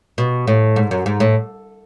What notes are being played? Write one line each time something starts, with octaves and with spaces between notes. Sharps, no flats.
B2
A2
G#2
F#2
G#2
A2